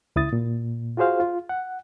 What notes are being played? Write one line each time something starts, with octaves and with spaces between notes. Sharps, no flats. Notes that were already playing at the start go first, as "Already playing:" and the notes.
C#2 E4 D#6 A6
A#2
F4 F#4 G#4 C5 F5
F4
F#5